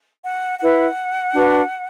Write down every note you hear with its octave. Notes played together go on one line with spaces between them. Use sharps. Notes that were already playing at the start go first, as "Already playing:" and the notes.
F#5
E4 B4 F#5
D4 F#4 B4